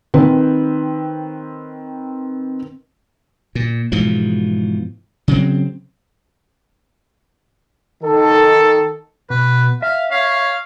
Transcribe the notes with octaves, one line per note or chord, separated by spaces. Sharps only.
D#3 C4 B4
A#2
G#2 B2 E3 F3
C#3 F#3 C4
D#3 A4
B2 B4
E5 F5
C#5 F5